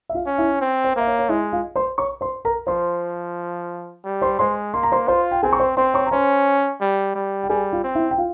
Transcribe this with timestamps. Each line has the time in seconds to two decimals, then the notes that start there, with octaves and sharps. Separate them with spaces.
0.09 E5
0.14 F4 F5
0.26 C#4
0.38 E4 E5
0.61 C4
0.84 C5
0.96 A#3 E5
1.07 C#5
1.19 C#5
1.29 G#3 E4 E5
1.53 F4 F5
1.76 C5 C6
1.98 C#5 C#6
2.21 C5 C6
2.45 A#4 A#5
2.67 F3 C5 C6
4.05 G3
4.22 C5 C6
4.39 G#3 C5 C6
4.74 A#3 C6
4.83 A#5
4.92 C5 C6
5.08 F4 C5 C6
5.31 G5
5.43 C4 G#4 G#5
5.53 C#6
5.59 C5 C6
5.77 C4 C5 C6
5.94 C#5 C#6
6.06 A#5
6.11 C#4 C5 C6
6.81 G3
7.15 G3
7.44 G5
7.49 G3 G#4 G#5
7.73 F4 F5
7.84 C4
7.95 E4 E5
8.11 G5
8.18 F4 F5